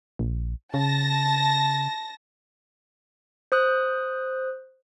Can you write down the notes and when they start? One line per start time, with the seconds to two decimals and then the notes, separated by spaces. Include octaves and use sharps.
0.19 A#1
0.74 C#3 A5 A#6
3.52 C5 D#6 F#6